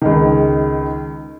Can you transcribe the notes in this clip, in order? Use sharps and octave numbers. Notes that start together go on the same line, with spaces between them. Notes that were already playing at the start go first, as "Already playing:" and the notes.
C#2 D#3